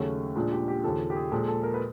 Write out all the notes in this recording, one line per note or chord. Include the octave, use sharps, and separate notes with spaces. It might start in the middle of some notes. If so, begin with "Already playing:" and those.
Already playing: D#2 C#3 F#3 A3 C#4
A#2 F3 G#3 D4
G4
G4
D#2 C#3 F3 A4
G4
G#4
A#2 F3 G#3 A4
A4
A#4
B4